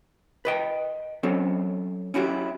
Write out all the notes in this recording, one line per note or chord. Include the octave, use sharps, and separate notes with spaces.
B4 D#5 G5
F#3 C4 C#4 A4
C#4 E4 F#4 G4